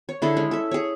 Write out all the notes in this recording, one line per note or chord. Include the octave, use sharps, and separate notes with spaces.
C#5
D3 E4 G#4 A4
G#3 C#4
A4 E5
G#4 C#5